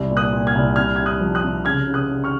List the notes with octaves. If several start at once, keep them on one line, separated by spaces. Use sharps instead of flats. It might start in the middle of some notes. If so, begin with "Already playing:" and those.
Already playing: C2
A#2
D#6 F#6
A#2
F6 G#6
C2
C3 F6 G#6
C3 G#6
D#6 F#6
F3
D#6 F#6
C3
C#3 F6 G#6
C#3
D#6 F#6
C#3
C#6 F6